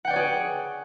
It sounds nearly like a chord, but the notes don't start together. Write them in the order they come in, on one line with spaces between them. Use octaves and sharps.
F#5 G5 D5 C#5 G#4